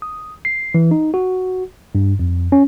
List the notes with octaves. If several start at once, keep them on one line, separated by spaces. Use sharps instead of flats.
D#6
C7
E3
D#4
F#4
G2
F2
C#4